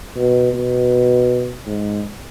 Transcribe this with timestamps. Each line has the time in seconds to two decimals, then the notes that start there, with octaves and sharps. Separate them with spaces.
0.16 B2
0.53 B2
1.66 G#2